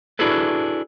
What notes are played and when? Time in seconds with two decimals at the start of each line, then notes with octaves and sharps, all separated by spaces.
0.19 D4 E4 F#4 G#4 A4 B4